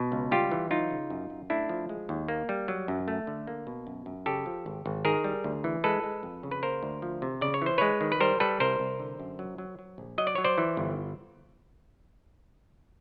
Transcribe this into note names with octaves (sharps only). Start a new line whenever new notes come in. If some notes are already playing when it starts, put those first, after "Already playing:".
Already playing: B2
C#2
G3 F4 G4
E3
F#3 D#4 F4
C#3
F#2
F#2
A3 D4 E4
F3
G#3
D#2
A#3
G3
F#3
F#2
A3
D3
A#3
B2
F#2
F#2
C#3 G4 A4
F3
G#1
G#1
D#3 G#4 A#4
G3
D2
E3
G#3 A4 B4
G#3
F2
C#3
B4
A#3 A#4 C5
D2
F3
C3
C#3 D5
C#5
E3 C5
G#3 B4 C#5
D#3
B4
G3 A#4 C5
G3 A4 B4
C2 A#4 C5
C2
D3
F#2
F#3
F#3
F#3
A#1
F#3 D#5
D5
F#3 C#5
C5 D5
E3
G1